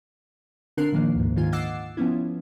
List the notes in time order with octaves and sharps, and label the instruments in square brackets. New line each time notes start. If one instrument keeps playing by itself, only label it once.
[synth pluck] D3 C4 D4 A#4 F#6 C7
A#2 D3 D#3 F3 A#3
D2 G#2
G#2 D#3 F4 G#5
D#5 F#5 D6 E6 A6 C7
F3 B3 C#4 E4